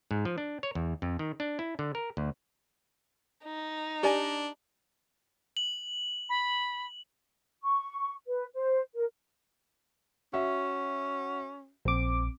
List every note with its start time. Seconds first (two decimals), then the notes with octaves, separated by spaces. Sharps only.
0.11 G#2
0.25 F3
0.38 D4
0.63 C#5
0.75 E2
1.02 F2
1.19 D#3
1.40 D4
1.59 E4
1.79 D3
1.95 A#4
2.17 D2
3.44 D#4
4.03 D4 G4 D5 G#5
5.57 F#7
6.29 B5
7.63 C#6
8.27 B4
8.54 C5
8.95 A#4
10.33 C#4 F#4 E5
11.85 A#1 C4 D6